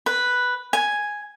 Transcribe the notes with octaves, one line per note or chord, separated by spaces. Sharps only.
B4
G#5